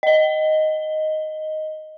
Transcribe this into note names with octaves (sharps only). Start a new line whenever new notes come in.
D#5 G7